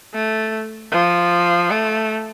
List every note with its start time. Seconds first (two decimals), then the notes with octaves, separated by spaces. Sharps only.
0.14 A3
0.92 F3
1.70 A3